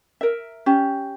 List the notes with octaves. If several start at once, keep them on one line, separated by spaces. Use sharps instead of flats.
A#4 E5
C#4 G4